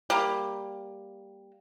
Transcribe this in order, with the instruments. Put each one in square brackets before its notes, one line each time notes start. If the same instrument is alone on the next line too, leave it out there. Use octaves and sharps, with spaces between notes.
[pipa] G3 A#3